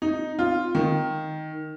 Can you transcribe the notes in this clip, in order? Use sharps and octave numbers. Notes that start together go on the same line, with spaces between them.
D#4
F4
D#3